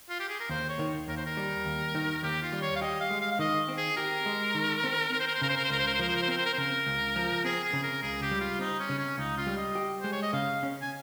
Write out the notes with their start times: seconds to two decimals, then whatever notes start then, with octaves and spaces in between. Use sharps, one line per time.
0.09 F4
0.20 G4
0.29 G#4
0.40 A#4
0.49 D#2 C5
0.69 C#5
0.79 D#3
1.08 D#2 A#4
1.17 C5
1.26 A#4
1.37 G3
1.65 D#2
1.95 D#3
2.23 D#2 G4
2.42 F4
2.52 G3
2.62 C#5
2.76 F5
2.81 G4 D#5
3.01 F5
3.10 G#3
3.21 F5
3.31 F5
3.39 D#3 D#5
3.68 C4
3.77 G#4
3.97 G4 A#4
4.26 G#3
4.55 D#3
4.84 C4
5.12 C4 A#4
5.20 C5
5.27 A#4
5.35 C5
5.42 C#3 A#4
5.49 C5
5.56 A#4
5.64 C5
5.70 C#2 A#4
5.79 C5
5.87 A#4
5.94 C5
5.99 F3 A#4
6.08 C5
6.16 A#4
6.22 C5
6.28 C4 A#4
6.37 C5
6.46 A#4
6.53 C5
6.58 C#3 A#4
6.87 C#2
7.16 F3
7.44 C4 G#4
7.64 G#4
7.73 C#3
7.83 A#4
8.02 C#2 G#4
8.22 G4
8.31 G3
8.40 F4
8.59 C4 D#4
8.80 C#4
8.89 C#3
8.99 C#4
9.18 C#2 D#4
9.37 F4
9.47 G3
9.57 D#5
9.75 G4
10.01 G#3 C5
10.12 C#5
10.22 D#5
10.33 C#3 F5
10.63 C#4
10.82 G#5